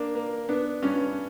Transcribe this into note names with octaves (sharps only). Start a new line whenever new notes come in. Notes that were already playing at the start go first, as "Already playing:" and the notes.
Already playing: A#3 D4
A#3
B3 D4
G2 C#4